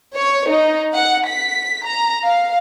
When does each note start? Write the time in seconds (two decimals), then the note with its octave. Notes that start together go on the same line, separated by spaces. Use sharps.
0.14 C#5
0.48 D#4
0.95 F#5
1.28 B6
1.84 A#5
2.24 F5